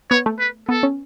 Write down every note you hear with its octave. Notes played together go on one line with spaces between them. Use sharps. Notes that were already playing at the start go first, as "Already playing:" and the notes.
B3 C#5
A3
B4
B3 A4
C#4